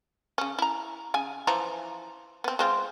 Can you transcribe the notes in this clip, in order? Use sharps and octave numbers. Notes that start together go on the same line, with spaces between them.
C#3 C#4
E4 A#5
C#3 G#5
E3 F3 A#5
B3 C4
G#3 C4 F4